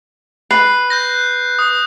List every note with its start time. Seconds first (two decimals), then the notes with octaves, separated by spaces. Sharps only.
0.51 B4 C7
0.90 F#6 G6 A#6
1.59 D#6